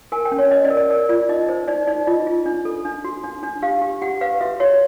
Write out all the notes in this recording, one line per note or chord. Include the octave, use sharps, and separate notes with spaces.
A#4 G#5
G5
C#4
C#5
C#4 D#5
D5
A#4
D5
A#4 D5
F4 D5
D#4 D#5
C5
D#4 D5
D#4 D5
F4 D#5
F4
D4
A4
D4
F#4
D4
D4
G4 F5
G4
G4 F#5
B4 F5
F#4 E5
F#4 C#5